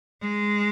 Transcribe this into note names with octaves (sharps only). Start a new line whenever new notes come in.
G#3